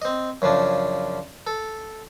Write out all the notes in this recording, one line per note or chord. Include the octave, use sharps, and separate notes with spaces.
C4 D#5
F#2 C#3 F3 D4
A4